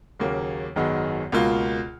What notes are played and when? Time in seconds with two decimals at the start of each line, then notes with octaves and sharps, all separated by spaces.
0.19 D#2 C#3 F#3 A#3
0.76 G#1 F#2 D#3 G#3 B3
1.32 C#2 B2 A#3 F4